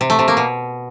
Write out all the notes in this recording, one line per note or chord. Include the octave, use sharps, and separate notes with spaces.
C3
A3
C3
A#3
B2